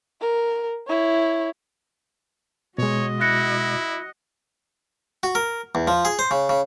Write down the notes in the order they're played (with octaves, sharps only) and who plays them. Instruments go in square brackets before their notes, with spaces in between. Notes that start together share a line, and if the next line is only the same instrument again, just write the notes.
[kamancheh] A#4
E4 C#5
[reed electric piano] B2 G#3 [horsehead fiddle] F#4 D#5 [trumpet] C#5
[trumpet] E4 [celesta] F#6 A#6 C#7
[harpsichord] F#4
A#4
E2
F3
G#4
C5
C#3
C#3